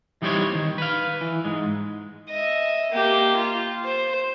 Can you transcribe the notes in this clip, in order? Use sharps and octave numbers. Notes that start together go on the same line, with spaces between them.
E3 G3 D#4 G4 C5 C#5
D#2 D#3
B4 F5
E3
G#2 G#3
D#5 E5
A#3 G4
F4
C5